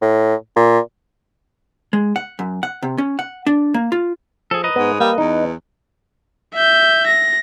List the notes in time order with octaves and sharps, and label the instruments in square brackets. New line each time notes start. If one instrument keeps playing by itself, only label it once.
[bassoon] A2
A#2
[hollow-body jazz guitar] G#3
F#5
F#2
F#5
C3
C#4
F#5
D4
A#3
F4
[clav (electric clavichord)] F3 [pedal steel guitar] G#4 A4
[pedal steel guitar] B4 D#5 A#5
[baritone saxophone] G#2 [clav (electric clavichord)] B3
[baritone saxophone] G3 [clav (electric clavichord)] A#3
[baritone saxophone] E2 [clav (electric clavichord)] D#4
[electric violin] E5 G6
A#6